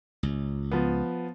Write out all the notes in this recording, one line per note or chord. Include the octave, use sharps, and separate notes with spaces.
C#2
F3 B3